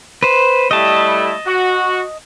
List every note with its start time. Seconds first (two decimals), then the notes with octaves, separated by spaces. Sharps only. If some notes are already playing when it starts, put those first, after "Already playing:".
0.23 B4 C5
0.71 G3 A3 E4 D#5 A5
1.47 F#4